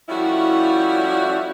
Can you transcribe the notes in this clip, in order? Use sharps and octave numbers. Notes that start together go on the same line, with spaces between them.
F3 G3 A3 C#4 E4 F#4